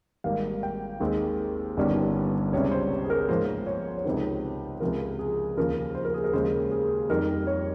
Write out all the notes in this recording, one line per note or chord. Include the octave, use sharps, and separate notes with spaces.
G#1 G#2 G3 A#3 F5
G5
D#2 D#3 G#3 C4
G1 G2 D#3 G3 C#4
C#2 C3 G3 C#4 C#5
C5
G#4
A#4
G#2 F3 A#3 C5
C#5
C#5
C#2 C3 D#3 C5
C#2 C3 F3 A#4
G#4
D#2 C#3 F3 A#4
C5
A#4
G#4
A#4
D#2 C#3 G#3 C#4 C5
G#4
F2 D#3 G3 A#4
C#5